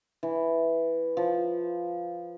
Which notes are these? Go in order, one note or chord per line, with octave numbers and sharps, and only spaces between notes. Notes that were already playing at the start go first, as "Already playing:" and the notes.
E3
F3